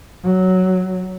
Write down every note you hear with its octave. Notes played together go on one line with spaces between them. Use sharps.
F#3